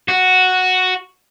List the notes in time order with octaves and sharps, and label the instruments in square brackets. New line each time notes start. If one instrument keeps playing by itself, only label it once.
[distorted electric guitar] F#4